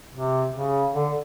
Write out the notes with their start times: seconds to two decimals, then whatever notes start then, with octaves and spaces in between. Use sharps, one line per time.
0.13 C3
0.53 C#3
0.94 D3